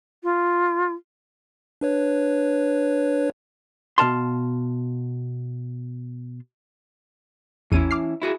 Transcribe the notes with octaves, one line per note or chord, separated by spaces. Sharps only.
F4
D4 B4 C#5
B2 F5 A5 C6
A1 E2 E3 C#4 E4 D#7
D6 F6 C7
E4 F#4 G#4